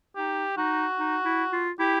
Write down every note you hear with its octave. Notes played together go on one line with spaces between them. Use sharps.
D#4 G4
D#4 F#4
D#4
E4
F4
E4 G4